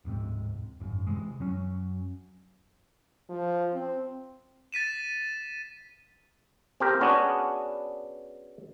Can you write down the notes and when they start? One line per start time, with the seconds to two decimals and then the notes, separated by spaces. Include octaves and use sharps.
0.05 D1 F2 G#2 C3
0.80 G#1 F#2
1.07 C3 E3 G#3
1.40 F#2 F#3 C#4
3.30 F3
3.74 C4
4.72 A6 B6 D#7 E7
6.80 C4 G4 A#4
7.01 B3 C#4 D4 F#4 G#4